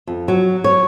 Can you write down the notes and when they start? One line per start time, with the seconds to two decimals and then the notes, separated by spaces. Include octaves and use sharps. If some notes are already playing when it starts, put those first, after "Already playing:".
0.07 F2
0.28 F#3
0.64 C#5